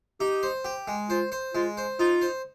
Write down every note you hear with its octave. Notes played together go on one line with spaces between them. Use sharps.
D#4 G4
C5
G4
G#3
F4 C5
C5
G#3 F4
C5
D#4 F4
C5